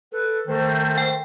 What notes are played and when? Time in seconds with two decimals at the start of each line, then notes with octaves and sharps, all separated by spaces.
0.12 A4 B4
0.47 D#3 A3 C5
0.98 G5